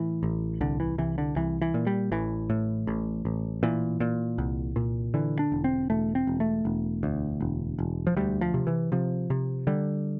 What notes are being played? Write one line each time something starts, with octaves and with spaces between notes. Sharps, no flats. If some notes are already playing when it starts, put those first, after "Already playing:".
Already playing: A2 E3
A1
C2 D3
E3
C2 E3
D3
C2 E3
E3
A#2
G3
A1 E3
A2
A1
A1
A#2 E3
A#2
C2
A#2
D3 E3
D4
E1
C4
E1 A3
C4
E1
A3
E1
D2
E1
E1
F3
D2 G3
F3
C3
E3
C3 F3
C3
D3 G3